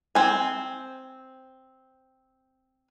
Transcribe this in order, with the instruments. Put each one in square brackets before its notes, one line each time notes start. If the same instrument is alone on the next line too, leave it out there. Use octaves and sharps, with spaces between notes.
[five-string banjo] C4 G#5